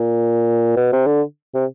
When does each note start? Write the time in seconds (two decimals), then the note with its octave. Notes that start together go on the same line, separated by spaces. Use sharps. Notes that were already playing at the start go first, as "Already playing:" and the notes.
Already playing: A#2
0.77 B2
0.92 C3
1.06 D3
1.55 C3